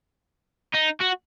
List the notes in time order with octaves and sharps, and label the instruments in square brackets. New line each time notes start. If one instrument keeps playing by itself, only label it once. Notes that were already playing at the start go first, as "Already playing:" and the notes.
[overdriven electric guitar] D#4
F#4